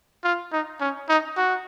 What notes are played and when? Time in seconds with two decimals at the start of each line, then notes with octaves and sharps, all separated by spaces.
0.24 F4
0.53 D#4
0.81 C#4
1.09 D#4
1.37 F#4